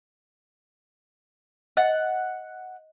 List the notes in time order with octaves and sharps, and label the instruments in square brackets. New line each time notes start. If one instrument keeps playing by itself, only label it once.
[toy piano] D#5 [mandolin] F#5